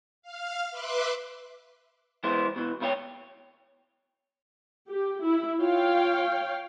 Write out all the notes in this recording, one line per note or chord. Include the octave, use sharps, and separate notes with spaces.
F5 F6
B4 E5 C6 D6 F#6
E3 G#3 B3 E4 C5
B2 E3
C#2 B2 E4 F4 C#5 G5
G4
E4
F4 C#5 F5 G5